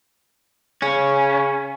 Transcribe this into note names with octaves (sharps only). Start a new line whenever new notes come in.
C#3 C#4